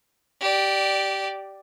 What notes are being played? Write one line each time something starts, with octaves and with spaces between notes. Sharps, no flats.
G4 D5